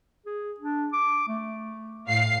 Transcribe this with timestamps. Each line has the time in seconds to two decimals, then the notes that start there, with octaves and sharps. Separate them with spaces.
0.26 G#4
0.60 D4
0.93 D6
1.28 A3
2.08 A2 F5 C7